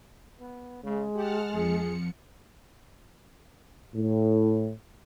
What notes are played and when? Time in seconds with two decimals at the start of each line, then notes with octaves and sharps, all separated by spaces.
0.40 B3
0.83 C#3 G#3
1.15 G4 F#5 A5 F6
1.51 F2 F3 G#4 C#7
3.94 A2